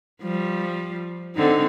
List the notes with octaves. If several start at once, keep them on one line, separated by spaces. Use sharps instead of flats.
F3 G3
D3 C4 D#4